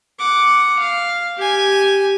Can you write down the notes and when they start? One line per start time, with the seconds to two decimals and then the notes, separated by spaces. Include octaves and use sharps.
0.19 F#5 D6
0.79 F5
1.37 G4 G#5